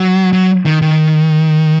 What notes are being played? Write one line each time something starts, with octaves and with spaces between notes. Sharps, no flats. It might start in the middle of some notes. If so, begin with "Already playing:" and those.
Already playing: F#3
F#3
D#3
D#3